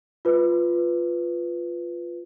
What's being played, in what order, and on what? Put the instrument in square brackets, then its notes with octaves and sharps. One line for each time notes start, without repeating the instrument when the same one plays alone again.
[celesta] F4 B4